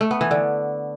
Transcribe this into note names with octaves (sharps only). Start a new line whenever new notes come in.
A3
B3
E3
D3